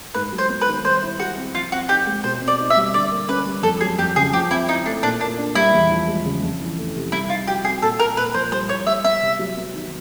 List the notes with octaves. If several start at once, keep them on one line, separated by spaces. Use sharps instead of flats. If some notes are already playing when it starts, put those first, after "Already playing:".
G#2 B4
F#3
C5
B3
B4
D#3
G3 C5
E4
F#4 G#4
C4
F3 F4
C4 F#4
D#4 G4
G#3
B2 C5
C4
D5
D#4
E5
G3
D3 D5
A#3
C#4 B4
G3
F2 A4
F#3 G#4
F2 G4
C#3 G#4
F3 G4
C4 E4
D#4 E4
A3 D4
A#2 D4
A#3 D4
D4
G3 E4
E2
F3
G#3
C#3
F2
E3
A3
C3
G3 E4
D#4 F4
F#4 G4
C4 G#4
A#2 A4
A#3 A#4
A#2 B4
F3 C5
G3 C5
E4 C#5
G3 E5
B3 E5
C3
F#3
B3
D#3